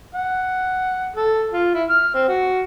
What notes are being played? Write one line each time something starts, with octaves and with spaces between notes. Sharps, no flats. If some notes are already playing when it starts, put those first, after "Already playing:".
F#5
A4
F4
E4
F6
C4
F#4